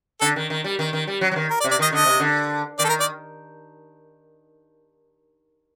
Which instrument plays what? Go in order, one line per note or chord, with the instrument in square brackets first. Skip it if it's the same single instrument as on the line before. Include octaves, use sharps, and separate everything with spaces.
[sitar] D3 [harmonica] A4
[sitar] D#3
D#3
G3
D#3
D#3
G3
F#3
F#3
D#3
[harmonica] A#4
D5
[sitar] C3
[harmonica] D5
[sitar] D#3 [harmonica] D#5
[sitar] D3 [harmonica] D#5
[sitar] C3
D3
[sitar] D#3 [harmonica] D5
[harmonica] A4
A#4
D5